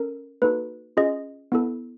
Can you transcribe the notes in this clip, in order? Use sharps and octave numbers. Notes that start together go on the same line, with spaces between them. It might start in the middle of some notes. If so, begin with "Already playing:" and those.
Already playing: C#4 A4 A#4
A#3 D#4 F#4 A4 B4
C#4 F4 G#4 D#5
B3 E4 A4